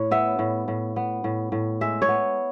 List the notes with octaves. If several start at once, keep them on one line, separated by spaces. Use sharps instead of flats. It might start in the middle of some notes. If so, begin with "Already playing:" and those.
Already playing: A2 C#5
B3 E5
A2
A2
B3
A2
A2
G#3 E5
C#5
B3